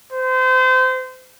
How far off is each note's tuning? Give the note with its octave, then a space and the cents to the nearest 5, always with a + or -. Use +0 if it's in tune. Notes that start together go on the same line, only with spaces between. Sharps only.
C5 -30